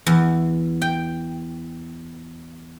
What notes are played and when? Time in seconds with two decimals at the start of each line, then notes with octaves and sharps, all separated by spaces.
0.06 E2
0.82 G5